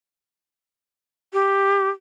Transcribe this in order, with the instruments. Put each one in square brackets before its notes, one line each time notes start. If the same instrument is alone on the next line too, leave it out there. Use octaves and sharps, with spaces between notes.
[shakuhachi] G4